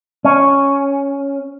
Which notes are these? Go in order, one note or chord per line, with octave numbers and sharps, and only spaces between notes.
C#4